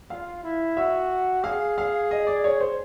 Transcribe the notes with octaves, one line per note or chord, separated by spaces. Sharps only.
F4 F5
E4
F#4 E5
G#4 F5
F5
D#5
D5
C#5
C5